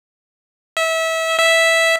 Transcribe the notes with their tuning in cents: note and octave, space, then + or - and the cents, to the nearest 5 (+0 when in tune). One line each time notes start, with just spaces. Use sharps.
E5 -25
E5 -5